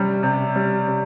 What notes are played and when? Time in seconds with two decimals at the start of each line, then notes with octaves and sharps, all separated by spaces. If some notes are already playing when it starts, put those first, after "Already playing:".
Already playing: C3 G3 C#4
0.23 C3
0.56 G3
0.87 C3